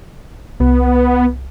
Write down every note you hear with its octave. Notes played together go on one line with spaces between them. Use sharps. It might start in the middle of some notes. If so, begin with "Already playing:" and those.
C2 B3